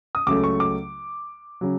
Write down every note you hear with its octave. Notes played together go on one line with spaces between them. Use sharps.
D#6
C#2 C#3 F#3 A3 D6
C#6
D6
C#3 F#3